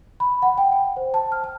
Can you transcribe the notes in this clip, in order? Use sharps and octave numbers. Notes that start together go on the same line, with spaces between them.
B5
F#5
G5
G5
C5
A5
F6
A5